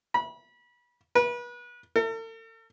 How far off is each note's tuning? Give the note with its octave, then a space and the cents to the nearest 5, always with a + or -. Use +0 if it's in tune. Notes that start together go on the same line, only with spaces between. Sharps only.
B5 -30
B4 -35
A4 +45